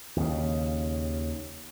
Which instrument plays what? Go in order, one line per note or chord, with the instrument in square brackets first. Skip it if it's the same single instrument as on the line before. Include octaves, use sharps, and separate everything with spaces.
[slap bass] D#2 C#3